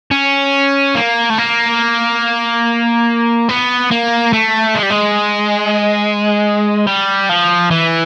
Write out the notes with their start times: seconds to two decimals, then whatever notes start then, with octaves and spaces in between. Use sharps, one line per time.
0.11 C#4
0.95 A#3
1.30 A3
1.38 A#3
3.49 B3
3.91 A#3
4.33 A3
4.75 G#3
4.83 G3
4.90 G#3
6.87 G3
7.29 F3
7.71 E3